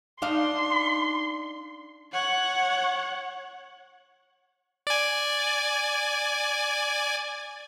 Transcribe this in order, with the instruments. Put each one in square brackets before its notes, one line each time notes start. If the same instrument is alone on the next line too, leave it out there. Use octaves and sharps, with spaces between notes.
[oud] D4 D#4 F5 [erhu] C6
[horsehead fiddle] C#5 F#5
[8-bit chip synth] D5 G#5